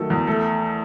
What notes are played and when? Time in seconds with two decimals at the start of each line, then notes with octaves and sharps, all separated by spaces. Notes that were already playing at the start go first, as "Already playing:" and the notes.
Already playing: D#3 F#3 A3 A4
0.10 E2
0.27 A3 A4